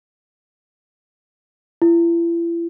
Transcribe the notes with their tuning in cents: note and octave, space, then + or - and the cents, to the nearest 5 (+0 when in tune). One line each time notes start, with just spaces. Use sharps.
E4 +40